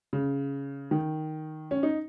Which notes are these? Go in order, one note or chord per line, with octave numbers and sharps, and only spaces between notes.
C#3
D#3
C#4
D#4